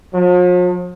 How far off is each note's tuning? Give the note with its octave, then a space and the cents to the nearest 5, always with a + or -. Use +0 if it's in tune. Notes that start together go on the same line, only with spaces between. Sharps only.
F3 +45